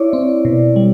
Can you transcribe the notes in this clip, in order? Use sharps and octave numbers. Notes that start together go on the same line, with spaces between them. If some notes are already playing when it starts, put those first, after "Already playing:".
Already playing: E4 C#5 D5
C4
B2
G3